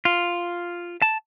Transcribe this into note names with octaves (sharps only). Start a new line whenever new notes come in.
F4
A5